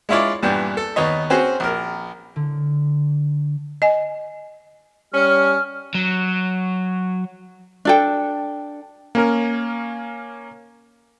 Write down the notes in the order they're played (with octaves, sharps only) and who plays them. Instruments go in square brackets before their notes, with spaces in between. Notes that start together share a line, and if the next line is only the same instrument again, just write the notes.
[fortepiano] G#3 D4 E4 F4 C#5 D5
G2 A#2 E3 B3 D4 G4
A4
D#2 B3 C#5 D#5
C4 C#4 F#4 G#4 C5
A#1 A#4
[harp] D3
[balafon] D#5 G#5
[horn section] G3 C#4 [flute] F6
[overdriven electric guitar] F#3
[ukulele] D4 A4 G5
[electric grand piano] A#3 C#4 A#4